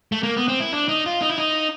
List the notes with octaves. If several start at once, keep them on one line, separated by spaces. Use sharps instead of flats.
A3
A#3
B3
C4
E4
D4
D#4
F4
D#4
E4
D#4